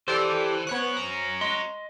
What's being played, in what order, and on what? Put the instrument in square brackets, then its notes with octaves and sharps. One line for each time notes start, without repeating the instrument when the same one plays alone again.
[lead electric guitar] E3 [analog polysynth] G4 A4 D5 [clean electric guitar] C5
[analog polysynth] B3 C#5 F#6 [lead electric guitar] C#4 F#4
[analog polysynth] A#5
[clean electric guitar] D#5 C6